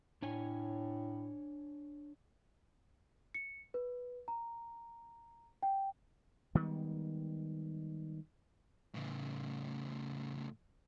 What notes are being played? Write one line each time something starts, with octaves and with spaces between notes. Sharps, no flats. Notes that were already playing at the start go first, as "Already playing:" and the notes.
A2 D4 C#5 G#5
C#7
B4
A#5
G5
D#3 G3 G#3 B3
A2 C#3